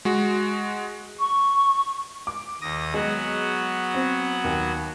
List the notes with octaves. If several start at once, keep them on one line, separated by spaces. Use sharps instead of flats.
G#3 F#4
C#6
D6
D#2 D#6 A#6
F#3 G#3 B3 F#4
C4
D#2